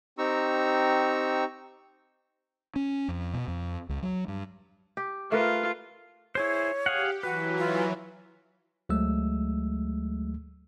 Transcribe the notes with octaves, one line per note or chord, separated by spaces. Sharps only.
C4 D#4 G4 A#5 C#6 E6
C#4
F2
B2
F2
C#2
F#3
G2
G4
A3 F4 A#4 B4
E4 G#4 C5 C#5
G4 G#4 F5 F#5
E3 F#3 F#4 B4
F4
D2 F#3 G#3 A3 E6